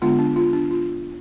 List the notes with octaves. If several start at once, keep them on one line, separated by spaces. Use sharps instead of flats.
D3 G#3 B3 D4 F4
D4
F4
D4
F4